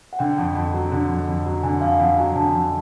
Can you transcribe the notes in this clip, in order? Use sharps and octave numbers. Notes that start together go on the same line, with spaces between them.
F#5
D3 G5
F2
F2
F#3
D3
F2
F2
F#3
D3 G#5
F2 F5
F2 F#5
F#3 G#5
D3 A5
F2